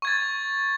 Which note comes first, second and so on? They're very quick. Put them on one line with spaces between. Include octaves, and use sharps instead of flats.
C#6 G#6 A6